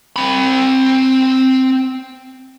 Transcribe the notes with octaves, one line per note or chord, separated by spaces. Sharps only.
C4 B5